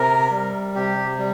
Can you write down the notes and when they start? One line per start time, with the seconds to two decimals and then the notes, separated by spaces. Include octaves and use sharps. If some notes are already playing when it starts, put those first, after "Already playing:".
Already playing: C3 A#4
0.31 G3
0.75 C3 G4
1.19 G3